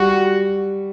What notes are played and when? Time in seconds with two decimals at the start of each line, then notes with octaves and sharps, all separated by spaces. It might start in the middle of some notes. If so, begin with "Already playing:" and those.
Already playing: G3 F#4